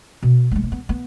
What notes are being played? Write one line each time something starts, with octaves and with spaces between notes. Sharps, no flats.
B2
A#3
G#3
A#3
B3
B3